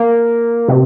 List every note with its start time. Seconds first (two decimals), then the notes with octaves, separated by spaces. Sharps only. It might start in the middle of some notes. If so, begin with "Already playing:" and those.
Already playing: A#3
0.68 C3